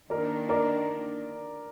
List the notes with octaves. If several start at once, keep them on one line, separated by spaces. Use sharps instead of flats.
D#3 A#3 D4 A#4 D5
A#4 D5